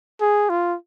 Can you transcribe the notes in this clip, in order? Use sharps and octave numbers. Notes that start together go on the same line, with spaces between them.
G#4
F4